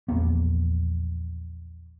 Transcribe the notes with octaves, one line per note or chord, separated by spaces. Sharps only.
A#1 E2 A#3 B3